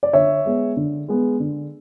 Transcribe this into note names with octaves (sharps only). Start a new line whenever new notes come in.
D5
D3 C#5 E5
G#3 B3
D3
G#3 B3
D3